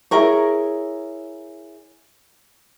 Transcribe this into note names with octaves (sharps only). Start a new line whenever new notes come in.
E4 G#4 A#4 C#5